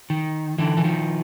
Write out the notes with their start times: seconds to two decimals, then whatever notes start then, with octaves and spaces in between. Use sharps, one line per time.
0.10 D#3
0.58 D3 E3
0.77 E3
0.84 D#3 F3